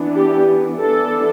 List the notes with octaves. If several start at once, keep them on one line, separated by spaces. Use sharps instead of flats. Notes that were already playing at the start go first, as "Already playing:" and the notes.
Already playing: E3 B3 D4
G4
E3 B3 D4 A4